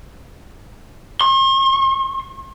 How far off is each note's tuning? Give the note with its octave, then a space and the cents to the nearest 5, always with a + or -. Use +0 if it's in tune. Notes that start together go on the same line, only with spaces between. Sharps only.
C6 +45